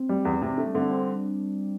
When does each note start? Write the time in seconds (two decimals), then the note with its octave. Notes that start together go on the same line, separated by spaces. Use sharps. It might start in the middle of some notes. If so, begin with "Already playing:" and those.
Already playing: C4
0.09 G3
0.25 E2
0.42 C3
0.58 A3 D4
0.66 G3
0.74 D3 C4
0.82 D4
0.90 C4